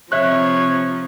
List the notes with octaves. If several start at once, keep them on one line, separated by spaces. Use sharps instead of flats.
C3 F3 C#5 E5 F#6